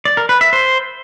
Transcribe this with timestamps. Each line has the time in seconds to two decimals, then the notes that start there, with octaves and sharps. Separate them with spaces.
0.05 D5
0.17 A#4
0.29 B4
0.41 E5
0.53 C5